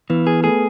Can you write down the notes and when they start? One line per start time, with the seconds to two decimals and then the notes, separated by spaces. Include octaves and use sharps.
0.10 E3 B3 B4
0.26 B3 G#4 B4
0.43 A3 G#4 A4